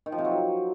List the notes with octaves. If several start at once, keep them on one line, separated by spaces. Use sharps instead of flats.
D#3
F3
C3
F#3